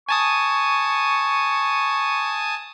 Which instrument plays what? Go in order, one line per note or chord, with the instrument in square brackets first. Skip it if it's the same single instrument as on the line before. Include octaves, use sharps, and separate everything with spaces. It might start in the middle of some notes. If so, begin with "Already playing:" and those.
[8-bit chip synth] G#5 A5 D#6 [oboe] C#6